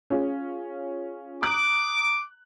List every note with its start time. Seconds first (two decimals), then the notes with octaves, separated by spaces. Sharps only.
0.10 C#4 F4 G#4
1.42 A#5 D6 D#6 F#6